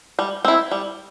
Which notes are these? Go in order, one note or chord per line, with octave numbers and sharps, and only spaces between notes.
G3
C4 E4
G3